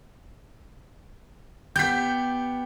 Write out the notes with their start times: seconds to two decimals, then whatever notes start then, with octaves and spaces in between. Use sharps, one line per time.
1.76 B3 G4 G6 B6